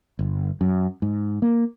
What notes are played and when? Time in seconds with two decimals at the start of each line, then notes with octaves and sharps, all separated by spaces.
0.19 G1
0.61 F#2
1.02 G#2
1.42 A#3